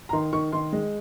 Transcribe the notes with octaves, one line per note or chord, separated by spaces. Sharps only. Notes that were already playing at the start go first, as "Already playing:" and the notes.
A#5
D#3 C6
D#3 C#6
D#3 C6
G#3